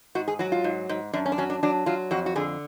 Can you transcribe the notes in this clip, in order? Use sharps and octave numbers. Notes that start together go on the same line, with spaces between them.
G#2 F#4
G#4
F#3 F#4
F4
G#2
G#2
F#2 D4
C#4
D4
F#3 C#4
D4
F#3 D4
F#3 F4
F2 F#4
F#4
D3 G#4